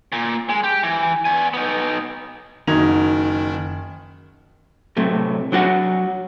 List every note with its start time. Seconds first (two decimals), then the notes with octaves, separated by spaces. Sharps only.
0.13 A#2
0.50 G#3
0.64 G4
0.83 E3
1.25 B3 G#5
1.54 B3 D#4
2.67 F#1 D#3 D#4 F#4 G#6 F7
4.97 A2 C3 F#3 A3
5.52 F#3 D4 F#4 F#5